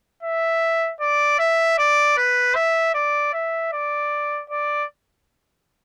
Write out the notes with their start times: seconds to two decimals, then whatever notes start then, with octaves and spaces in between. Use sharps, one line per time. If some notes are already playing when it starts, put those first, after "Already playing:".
0.23 E5
1.00 D5
1.39 E5
1.78 D5
2.18 B4
2.55 E5
2.94 D5
3.33 E5
3.73 D5
4.50 D5